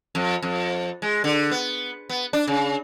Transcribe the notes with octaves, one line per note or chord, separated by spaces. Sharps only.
F2
F2
G#3
D3
B3
B3
D4
C#3